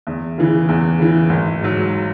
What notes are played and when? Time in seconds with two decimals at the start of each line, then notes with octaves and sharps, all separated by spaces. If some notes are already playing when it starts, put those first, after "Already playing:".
0.07 E2
0.38 C#3 E3
0.69 E2
0.99 C#3 E3
1.29 G#1
1.61 G#2 F#3